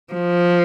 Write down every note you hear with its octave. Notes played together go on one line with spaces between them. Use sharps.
F3